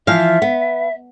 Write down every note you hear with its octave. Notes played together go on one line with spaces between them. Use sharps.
E3 F3 E5 F5
B3